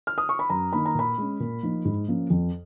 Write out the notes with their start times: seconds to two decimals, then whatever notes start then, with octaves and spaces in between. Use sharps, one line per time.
0.07 F6
0.18 D#6
0.29 C#6
0.39 B5
0.50 F#2 A#5
0.73 D#3 A#3 D#4 B5
0.86 A#5
0.95 A#2 B5
1.18 G#3 C#4
1.40 A#2
1.63 F3 A#3 D#4
1.85 G#2
2.08 F3 A#3 C#4
2.30 F2